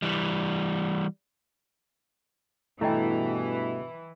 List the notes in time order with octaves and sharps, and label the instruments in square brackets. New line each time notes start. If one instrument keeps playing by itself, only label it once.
[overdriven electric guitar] E3 G3
[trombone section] G2 B2 [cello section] E3 [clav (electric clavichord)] A3 [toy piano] E4 D#5 G5